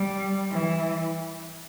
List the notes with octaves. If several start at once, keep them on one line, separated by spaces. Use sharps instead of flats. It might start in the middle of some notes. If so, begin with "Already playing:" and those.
Already playing: G3
E3